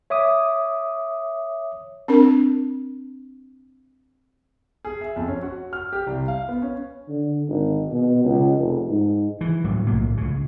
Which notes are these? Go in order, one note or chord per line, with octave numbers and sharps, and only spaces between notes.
C#5 E5 D6 D#6
C4 D4 A#4
G#4
E5
F2
C#4
F#4
F6
G4
C2
F5
B3
C#4
D3
G#1
B2
C#2
F1
G#2
E3
D2 A2 F#3 G3
B1 A2 A#3
C#2 C#3